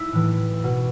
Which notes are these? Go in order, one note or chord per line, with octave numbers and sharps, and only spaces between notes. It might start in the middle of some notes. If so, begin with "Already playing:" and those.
Already playing: E4
A2 E3
B2